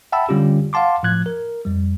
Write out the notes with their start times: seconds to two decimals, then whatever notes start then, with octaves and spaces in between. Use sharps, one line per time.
0.12 E5 F#5 G5 A5 B5 E6
0.29 D3 G3 C#4 F4 G4
0.73 F5 F#5 A5 C6 D6
1.03 A2 F3 F#6 G#6
1.26 A#4
1.65 F2 G3